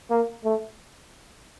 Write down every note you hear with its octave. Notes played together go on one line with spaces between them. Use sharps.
A#3
A3